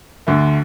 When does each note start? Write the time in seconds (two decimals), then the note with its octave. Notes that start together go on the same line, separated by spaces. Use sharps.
0.27 D2 D3 A3